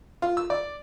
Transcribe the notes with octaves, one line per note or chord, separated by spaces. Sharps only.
F4
E6
D5